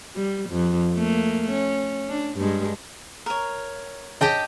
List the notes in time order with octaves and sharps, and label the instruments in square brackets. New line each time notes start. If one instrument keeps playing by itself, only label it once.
[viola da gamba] G3
F2
A3 A#3
C#4
D4
G2 G#3
[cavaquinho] A#4 C#5
[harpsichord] C#3 [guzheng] G4 D#5 G5 [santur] A5